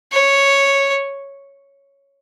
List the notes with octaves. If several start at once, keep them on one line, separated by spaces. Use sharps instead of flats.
C#5